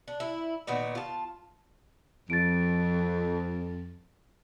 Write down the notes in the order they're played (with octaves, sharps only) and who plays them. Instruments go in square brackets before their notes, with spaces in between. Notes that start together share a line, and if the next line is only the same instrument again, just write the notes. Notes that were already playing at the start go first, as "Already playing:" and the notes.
[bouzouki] D4
E4
A#2 D#3 B3 F#4
F4 A5
[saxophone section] F2 [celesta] A6 D7